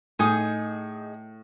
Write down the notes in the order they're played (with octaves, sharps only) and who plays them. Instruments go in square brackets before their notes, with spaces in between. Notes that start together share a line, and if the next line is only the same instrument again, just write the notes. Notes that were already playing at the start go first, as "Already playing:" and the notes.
[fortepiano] A2 [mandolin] D#4 G#4